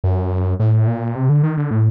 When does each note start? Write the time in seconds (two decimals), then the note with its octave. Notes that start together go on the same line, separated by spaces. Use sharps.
0.04 F#2
0.60 A2
0.87 A#2
1.15 C3
1.29 D3
1.43 D#3
1.57 D3
1.71 A2